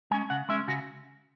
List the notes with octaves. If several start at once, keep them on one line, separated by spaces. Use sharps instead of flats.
G#3 C#4 G#5
C#3 F#5
G#3 C#4 E5
C#3 F#4